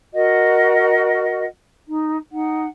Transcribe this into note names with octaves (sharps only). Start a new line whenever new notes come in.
F#4 A#4 D#5 F#5
D#4
D#4 F#5